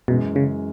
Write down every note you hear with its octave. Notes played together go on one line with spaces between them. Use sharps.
F#2 B2 E3 G#3
C#3